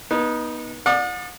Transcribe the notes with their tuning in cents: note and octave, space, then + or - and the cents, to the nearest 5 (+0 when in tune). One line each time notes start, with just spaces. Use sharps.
B3 -30 D#4 +0
D5 +10 F#5 -40 D#6 -35